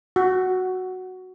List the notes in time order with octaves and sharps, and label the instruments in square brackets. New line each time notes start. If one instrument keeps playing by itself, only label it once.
[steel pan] F#4